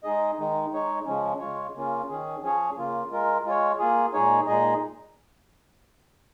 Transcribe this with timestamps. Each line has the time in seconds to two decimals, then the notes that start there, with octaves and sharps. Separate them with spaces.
0.04 G#3 D#4 G#4 D#5
0.38 D#3 G#3 D#4
0.73 G#3 D#4 C#5
1.06 C#3 F3 G#3 C#4
1.40 C#3 G#3 F4 C#5
1.75 C#3 A#3 C#4 F4
2.08 D#3 C#4 G#4
2.42 F3 C#4 G#4 C#5
2.77 C#3 A#3 F4
3.11 G#3 F4 A#4
3.45 G#3 F4 C#5
3.79 A#3 F4 G#4
4.14 A#2 G#3 D#4 G#4 C#5
4.47 A#2 G#3 D#4 G#4 D#5